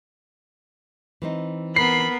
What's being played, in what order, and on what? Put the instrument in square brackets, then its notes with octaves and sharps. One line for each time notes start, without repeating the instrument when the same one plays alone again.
[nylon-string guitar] E3 C4 D#4
[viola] B3 A#4 [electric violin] B5 [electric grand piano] C7